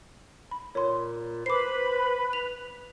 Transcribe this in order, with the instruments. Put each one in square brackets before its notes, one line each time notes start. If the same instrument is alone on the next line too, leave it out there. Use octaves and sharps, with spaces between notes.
[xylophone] B5
[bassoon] A#2 [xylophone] C#5 C6
[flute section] B4 B5 [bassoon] C5 [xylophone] D6 C7
[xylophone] F7